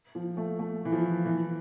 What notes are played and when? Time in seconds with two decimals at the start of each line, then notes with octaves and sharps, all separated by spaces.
0.15 F3
0.37 A3
0.59 A3
0.85 E3
0.92 F3
1.25 E3